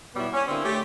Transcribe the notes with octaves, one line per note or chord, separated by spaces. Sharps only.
B2 F#3 G3 B3 E4
C#4
D3 A#3 C4 D4 E4
A3 C#4 G4